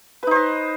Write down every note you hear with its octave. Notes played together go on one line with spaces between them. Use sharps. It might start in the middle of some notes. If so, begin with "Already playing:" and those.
D#4 B4 C5 D#5